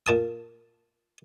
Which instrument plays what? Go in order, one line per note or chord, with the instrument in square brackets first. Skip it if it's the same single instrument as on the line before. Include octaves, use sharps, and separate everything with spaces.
[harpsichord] A#2 A5 D#6